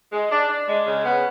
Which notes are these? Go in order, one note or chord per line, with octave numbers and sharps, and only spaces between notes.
G#3
D4
D4
G#3
C#3
B3